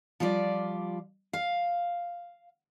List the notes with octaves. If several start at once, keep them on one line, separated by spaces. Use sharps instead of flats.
F3 G3 F4 D5
F5